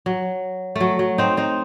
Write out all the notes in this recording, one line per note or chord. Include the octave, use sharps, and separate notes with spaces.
F#3
F#3 A3
F#3
C4 D#4
C4 D#4